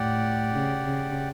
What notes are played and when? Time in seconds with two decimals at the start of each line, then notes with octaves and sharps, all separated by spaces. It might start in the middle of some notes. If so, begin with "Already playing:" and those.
Already playing: A2 G4 D5 F#5
0.53 C#3
0.84 C#3